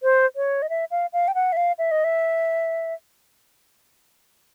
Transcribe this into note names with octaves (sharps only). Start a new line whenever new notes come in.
C5
C#5
D#5
E5
F5
F5
G5
F#5
E5
F5
E5
D#5
E5